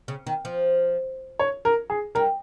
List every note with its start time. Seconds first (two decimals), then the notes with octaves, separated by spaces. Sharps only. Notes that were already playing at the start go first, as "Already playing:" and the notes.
0.08 C#3
0.27 D#3
0.45 F3
1.39 C#5
1.65 A#4
1.90 G#4
2.15 G3 A#4